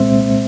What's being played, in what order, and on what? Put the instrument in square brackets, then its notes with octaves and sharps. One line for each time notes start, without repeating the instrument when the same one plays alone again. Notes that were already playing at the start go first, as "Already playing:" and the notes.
Already playing: [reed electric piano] C2 A#2 G#3 C4 C5 E5